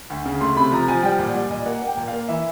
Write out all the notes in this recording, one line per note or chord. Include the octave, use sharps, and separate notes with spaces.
D2
C#3
A3 C6
C3 B5
F3 A#5
F3 G#5
G3 G5
A#2 F#5
G3 D5
A#2 D#5
A#3 F#5
A#3 G5
A#2
A#3 F5
E3 E5